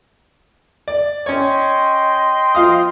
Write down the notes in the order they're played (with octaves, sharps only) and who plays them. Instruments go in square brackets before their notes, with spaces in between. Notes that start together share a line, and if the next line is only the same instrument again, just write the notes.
[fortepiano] D5
[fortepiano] C#4 C#5 [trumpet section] D#5 G5 C6
[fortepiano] F3 F5 D#6